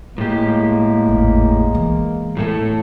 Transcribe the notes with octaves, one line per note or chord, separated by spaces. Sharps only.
A2 G#3 A#3 G4
G#1 E2
E3 B3
A2 A3 A4